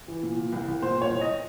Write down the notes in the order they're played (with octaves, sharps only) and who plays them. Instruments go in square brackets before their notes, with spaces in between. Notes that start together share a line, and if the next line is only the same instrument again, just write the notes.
[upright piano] E3
A#2
A#2
C2
C2
A#2 C5
A#2 C#5
C2
D#5